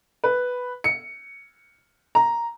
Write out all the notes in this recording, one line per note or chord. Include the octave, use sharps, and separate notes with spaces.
B4
C#7
A#5